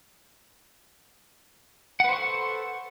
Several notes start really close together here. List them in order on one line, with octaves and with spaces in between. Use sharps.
F#5 B4 C5 C#6 A4